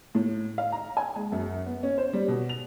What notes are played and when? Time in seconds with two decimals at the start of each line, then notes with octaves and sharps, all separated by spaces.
0.15 A2
0.58 F5
0.72 A#5
0.97 G#5
1.16 G#3
1.32 F#2
1.66 B3
1.83 C#4
1.98 C5
2.13 G3
2.28 B2
2.49 F7